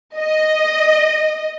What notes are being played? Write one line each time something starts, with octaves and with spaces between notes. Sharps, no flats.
D#5